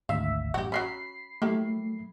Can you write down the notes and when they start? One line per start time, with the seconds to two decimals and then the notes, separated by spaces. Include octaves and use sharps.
0.09 G#1 D2 E5 F5
0.54 A1 F#2 F#4 G4
0.72 F#3 A#3 C#4 B5 C7
1.42 F#3 A3 A#3 E4 G4